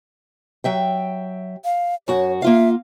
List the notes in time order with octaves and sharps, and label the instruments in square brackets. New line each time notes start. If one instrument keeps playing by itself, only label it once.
[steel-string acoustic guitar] F#3 E5 G5
[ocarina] F5
[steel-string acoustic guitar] F#2 F#4 F#5 [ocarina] C#5
[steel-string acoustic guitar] A#3 F4 F5 [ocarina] E5